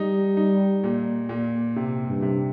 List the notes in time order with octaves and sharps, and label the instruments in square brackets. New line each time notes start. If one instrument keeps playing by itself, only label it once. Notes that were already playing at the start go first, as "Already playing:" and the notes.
Already playing: [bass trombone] G3 [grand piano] D#4
[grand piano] D#4
A#2
A#2
C3
[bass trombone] G2
[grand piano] C3